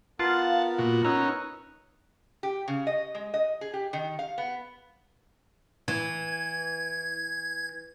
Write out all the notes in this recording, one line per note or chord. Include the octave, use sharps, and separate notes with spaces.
B3 F4 A#4 F#5 A5
A#2 F#4
C#4 D#4 A#5 E6 F#6
G4
C#3
D#5
G#3
D#5
G#4
G4
D#3
F5
B3
E3 G#6